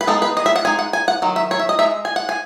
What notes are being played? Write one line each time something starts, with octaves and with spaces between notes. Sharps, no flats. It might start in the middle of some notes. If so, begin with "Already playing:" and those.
B4
G#3 B3 D#4 A4
B4
D#5
E5
F#5
G#3 D#4 G#5
F#5
G#5
F#5
D#3 F#3
E5
C#5
E5
D#5
D#4 E5
G#3
G#5
F#5
G#5